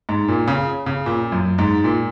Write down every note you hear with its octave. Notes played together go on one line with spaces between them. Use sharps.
G#2
A#2
C#3
C#3
A#2
F#2
G#2
A#2